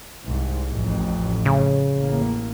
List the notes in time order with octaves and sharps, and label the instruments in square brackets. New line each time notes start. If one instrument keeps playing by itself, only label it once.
[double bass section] C2 G#2
A1 F2
[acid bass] C#3
[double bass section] A1 A#3